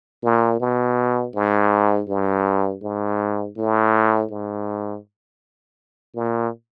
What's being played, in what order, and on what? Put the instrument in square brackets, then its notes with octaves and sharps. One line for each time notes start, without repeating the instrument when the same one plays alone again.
[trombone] A#2
B2
G#2
G2
G#2
A2
G#2
A#2